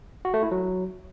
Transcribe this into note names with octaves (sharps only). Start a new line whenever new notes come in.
F#4
A3
E4
F#3